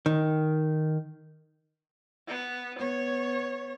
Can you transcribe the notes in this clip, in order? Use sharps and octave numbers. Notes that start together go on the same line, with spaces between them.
D#3
B3
B3 C#5